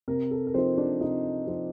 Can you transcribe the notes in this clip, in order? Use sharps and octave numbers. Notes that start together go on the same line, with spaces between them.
C3 A#4
A4
A#4
F3 C4 D#4 C5
D4 D5
C3 D#4 D#5
F3 C4 D#4